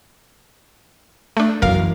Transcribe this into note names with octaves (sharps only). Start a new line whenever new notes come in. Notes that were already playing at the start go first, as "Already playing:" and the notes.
A3 D4
F#2 E3 A#4 F5